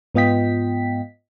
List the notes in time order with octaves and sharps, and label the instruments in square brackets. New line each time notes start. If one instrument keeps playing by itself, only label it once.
[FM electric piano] G#2 B3 F4 D#5 G5 B6